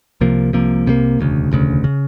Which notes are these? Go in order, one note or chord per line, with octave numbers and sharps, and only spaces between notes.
C2 C3 F3 A#3
C2 C3 F3 A#3
C2 C3 F3 A#3
E1 D2 C#3
E1 D2 C#3
C#3